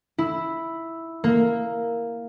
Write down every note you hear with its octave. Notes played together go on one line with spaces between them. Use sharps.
E4
A#3